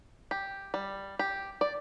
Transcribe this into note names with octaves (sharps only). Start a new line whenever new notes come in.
G4
G3
G4
D5